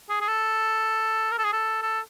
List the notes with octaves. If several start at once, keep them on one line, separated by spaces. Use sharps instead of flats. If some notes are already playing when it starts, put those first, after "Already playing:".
G#4
G#4
A4
A#4
A4
G#4
A4
A4